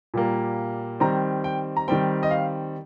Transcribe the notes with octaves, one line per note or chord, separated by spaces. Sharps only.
A#2 G3 A#3
D#3 G3 C4 A#5
G5
A#5
D#3 G3 C4 G5
D#5
F5